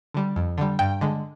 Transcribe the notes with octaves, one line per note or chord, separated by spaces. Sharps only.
D3 G3
F2
D3 G3
G2 G5
D3 G#3